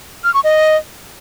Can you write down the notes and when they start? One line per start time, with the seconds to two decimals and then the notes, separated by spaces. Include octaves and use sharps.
0.24 F6
0.34 C#6
0.44 D#5